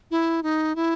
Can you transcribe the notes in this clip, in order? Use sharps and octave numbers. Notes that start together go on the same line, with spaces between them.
E4
D#4
E4